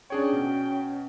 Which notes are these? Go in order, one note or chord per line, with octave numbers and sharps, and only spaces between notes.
C#4 D4 G#4 C#5 G5
B2